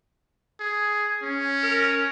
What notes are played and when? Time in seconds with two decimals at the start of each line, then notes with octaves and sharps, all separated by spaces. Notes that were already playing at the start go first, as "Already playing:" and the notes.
0.60 G#4
1.22 C#4
1.63 A#4